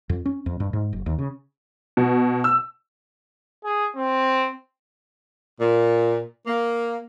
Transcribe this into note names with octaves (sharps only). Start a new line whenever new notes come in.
F2
C#4
F2
G2
G#2
F#1
D#2
C#3
B2
E6
G#4
C4
A#2
A#3